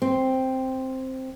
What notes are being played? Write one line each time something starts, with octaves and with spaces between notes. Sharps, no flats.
C4